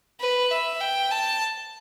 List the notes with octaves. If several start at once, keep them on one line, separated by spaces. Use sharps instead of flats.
B4
E5
G5
A5